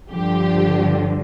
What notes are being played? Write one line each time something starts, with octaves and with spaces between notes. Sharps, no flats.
G2 D3 F3 G4